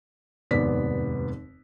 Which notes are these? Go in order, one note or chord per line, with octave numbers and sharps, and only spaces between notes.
F1 D#2 G#2 B3 D5 B6